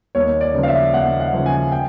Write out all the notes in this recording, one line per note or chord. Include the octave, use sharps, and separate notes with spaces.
D#2 C#5
D5
C#3 F3
F5
E5
D#2 F#5
F#5
C#3 F3
G#5
G5